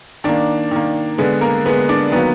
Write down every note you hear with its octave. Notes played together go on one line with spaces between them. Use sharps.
D#3 A#3 D4 D5
D#3 A#3
D3 G#3 B3 B4
A#3 A#4
D3 G#3 B3 B4
D4 D5
D#3 F#3 A#3 B3 B4